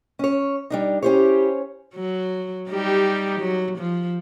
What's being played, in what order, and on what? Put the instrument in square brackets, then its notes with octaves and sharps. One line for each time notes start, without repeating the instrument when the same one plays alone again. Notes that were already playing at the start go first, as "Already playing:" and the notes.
[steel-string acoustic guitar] C#4 C#5
G3 D4 D#4
[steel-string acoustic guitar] C#4 C5 C#5 [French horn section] E4 G4
[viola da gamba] F#3
G3 D#4 G4
F#3
F3